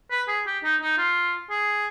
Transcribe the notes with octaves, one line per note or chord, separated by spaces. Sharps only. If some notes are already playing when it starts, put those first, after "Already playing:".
B4
G#4
G4
D#4
D#4
F4
G#4